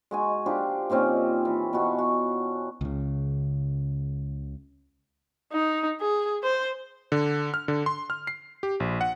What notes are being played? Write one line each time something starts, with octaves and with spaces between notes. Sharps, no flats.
G#3 F#4 G#5
D4 F4 G4 C5
A#2 D#3 C4 C#4
E3
B2 E4 F#4 A5
F#4
C#2 C#3
D#4
G#4
C5
D3
F6
D3
C6
F6
C7
G4
A#1
F#5